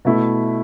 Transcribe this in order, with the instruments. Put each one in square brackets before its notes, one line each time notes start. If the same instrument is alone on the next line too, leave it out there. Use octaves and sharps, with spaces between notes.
[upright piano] B2 A3 E4